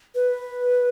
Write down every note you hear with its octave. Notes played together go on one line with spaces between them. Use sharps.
B4